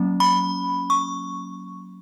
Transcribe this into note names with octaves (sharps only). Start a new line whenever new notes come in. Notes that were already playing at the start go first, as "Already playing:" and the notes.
Already playing: F#3 A#3 C#4
B5
C#6